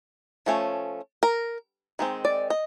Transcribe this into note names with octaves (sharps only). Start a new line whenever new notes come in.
F3 A3 C#4
A#4
D#3 G#3 C4
D5
D#5